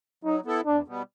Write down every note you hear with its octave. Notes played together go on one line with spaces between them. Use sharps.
F#3 D#4
B3 E4 A4
E2 D4
B2 G3 B3